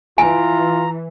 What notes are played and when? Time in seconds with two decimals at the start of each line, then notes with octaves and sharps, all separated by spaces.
0.18 E3 F4 G#5 A#5